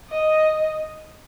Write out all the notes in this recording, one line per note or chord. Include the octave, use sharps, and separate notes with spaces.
D#5